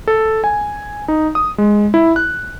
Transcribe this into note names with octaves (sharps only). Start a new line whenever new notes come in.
A4
G#5
D#4
D#6
G#3
E4
F#6